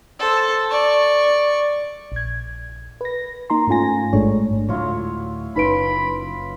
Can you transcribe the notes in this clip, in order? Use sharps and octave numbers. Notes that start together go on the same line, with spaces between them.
A4 C5
D5 C#6
A#1 G#6
B4 A#6
A#3 D#4 A#5 C6
G#2 A3 C#4 F4 G#5 A#6
A1 G#2 G#3 A3 D4 C#5
D2 A2 F#3 E4 F4 C#5
F#1 C#4 D#4 B4 B5 C6 D7